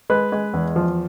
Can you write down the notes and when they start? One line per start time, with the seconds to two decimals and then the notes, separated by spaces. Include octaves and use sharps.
0.10 G#3 B4
0.32 G#3
0.54 E2
0.76 F3